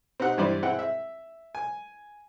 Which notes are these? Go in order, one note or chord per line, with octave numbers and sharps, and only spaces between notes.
C4 D#4 G4 F#5
G2 E3 G3 C5 D5
C4 E4 G#4 F#5 G5
E5
G#5